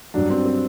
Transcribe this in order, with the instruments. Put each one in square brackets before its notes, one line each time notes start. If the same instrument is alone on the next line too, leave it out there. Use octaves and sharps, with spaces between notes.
[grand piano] G2 F#3 D4
C4
C4